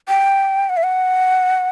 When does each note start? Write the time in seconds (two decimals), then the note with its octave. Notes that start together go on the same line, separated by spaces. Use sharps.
0.08 G5
0.69 F#5
0.77 E5
0.83 F#5